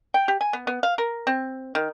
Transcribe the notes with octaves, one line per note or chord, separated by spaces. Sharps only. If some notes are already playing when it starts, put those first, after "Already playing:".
G5
G4
G#5
B3
B3
F5
A#4
C4
D#3